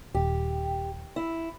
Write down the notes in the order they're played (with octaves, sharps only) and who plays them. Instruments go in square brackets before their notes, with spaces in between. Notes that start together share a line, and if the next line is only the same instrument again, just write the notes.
[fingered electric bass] D#1 [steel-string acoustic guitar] G4
[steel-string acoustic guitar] E4